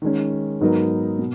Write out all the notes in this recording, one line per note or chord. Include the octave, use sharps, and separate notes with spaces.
D#3 G#3 C#4
G#2 F#3 B3 D#4 A#4
B2